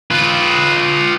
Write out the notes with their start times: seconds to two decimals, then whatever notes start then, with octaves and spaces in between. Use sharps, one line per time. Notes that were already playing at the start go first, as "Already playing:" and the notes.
0.11 F4 B4